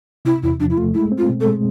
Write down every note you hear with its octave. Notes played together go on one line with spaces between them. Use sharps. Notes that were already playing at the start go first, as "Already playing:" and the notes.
C3 E4
E2 E4
F3 D4
E4
A3 F4
G#3 E4
C4
F4
B2
A4
G#3